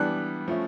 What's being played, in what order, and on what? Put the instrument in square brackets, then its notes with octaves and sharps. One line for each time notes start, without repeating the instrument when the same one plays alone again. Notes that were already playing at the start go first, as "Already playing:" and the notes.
Already playing: [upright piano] E3 G3 B3 D4 F#6
F3 A3 C#4